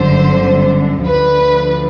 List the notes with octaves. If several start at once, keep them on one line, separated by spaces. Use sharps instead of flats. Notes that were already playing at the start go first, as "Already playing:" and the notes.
Already playing: G1 F#2 D3 C5
D2 D3 F3 B4